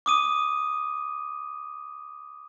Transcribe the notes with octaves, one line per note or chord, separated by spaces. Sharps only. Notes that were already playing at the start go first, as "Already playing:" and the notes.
D6 D#6 D#7